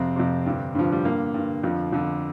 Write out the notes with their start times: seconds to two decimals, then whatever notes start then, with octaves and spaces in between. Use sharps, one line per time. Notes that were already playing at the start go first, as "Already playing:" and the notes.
Already playing: F2 C3 C4
0.16 F2 C3
0.46 G2 D3
0.75 G2 D3 F3
0.92 G3
1.05 G2 D3 A#3
1.34 G2 D3
1.63 F2 D3 F3
1.93 F2 D3